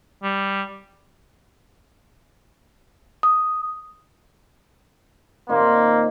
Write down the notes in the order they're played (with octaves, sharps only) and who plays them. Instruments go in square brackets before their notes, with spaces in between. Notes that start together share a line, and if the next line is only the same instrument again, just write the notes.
[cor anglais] G3
[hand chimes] D#6
[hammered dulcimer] A#2 D#3 C4 [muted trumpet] A#3